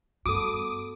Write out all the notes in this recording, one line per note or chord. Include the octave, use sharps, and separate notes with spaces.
G2 B3 F#4 A4 D6 D#6